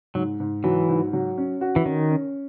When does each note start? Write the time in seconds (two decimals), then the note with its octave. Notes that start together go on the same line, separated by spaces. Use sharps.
0.15 G#2 F#3
0.40 G#2
0.64 E3 F#3
0.88 G#2
1.13 F#3
1.37 C#4
1.61 F#4
1.76 E3
1.85 D#3 C#4
2.10 C#4